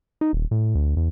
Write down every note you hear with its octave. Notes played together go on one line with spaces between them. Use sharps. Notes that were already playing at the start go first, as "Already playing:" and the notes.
D#4
D#1
A2
D2
E2